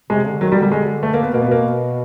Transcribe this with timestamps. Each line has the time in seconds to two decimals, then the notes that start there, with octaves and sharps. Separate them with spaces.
0.10 C3 G#3
0.26 D3
0.41 D#3 F#3
0.52 G3
0.57 D3
0.62 G3
0.72 G#3
1.03 A3
1.14 A#3
1.23 B3
1.33 B2 A#3
1.42 B3
1.49 B2 A#3